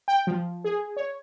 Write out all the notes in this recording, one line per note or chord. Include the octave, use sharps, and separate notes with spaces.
G5
F3
G#4
C#5